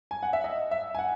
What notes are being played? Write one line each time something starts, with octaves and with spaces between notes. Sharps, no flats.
G#5
F#5
E5
D#5
E5
G#5
F#5